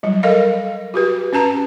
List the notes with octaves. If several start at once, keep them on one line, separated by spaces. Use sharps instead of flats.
F#3 G3
A4 A#4 D#5 F5
F#4 G4 B4
C#4 B4 A5 A#5